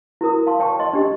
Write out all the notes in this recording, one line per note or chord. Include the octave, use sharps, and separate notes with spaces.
E4 F#4 A#4 D#6
F5 A5 C6
C#5 G5 A5 C#6
D#5 C6
D4 G4 D#5